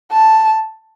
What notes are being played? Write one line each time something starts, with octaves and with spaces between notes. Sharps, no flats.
A5